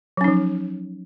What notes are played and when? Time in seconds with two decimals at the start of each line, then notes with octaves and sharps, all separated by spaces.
0.17 F#3
0.21 C#4
0.24 D#4
0.28 F3